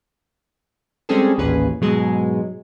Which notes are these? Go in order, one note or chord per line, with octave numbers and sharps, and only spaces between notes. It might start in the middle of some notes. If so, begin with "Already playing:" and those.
G3 G#3 C4 C#4 G#4 A4
A1 D#2 A#2 C#4 G#4 B4
G#2 B2 F#3 G#3 G#4